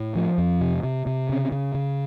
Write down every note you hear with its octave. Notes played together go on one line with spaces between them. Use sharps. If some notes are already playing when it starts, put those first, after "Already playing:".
Already playing: A2
F3
F2
C3
C3
C3
C#3
C#3
C#3